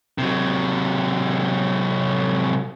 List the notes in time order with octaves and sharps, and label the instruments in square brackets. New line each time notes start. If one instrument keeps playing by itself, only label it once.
[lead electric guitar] C3 F#3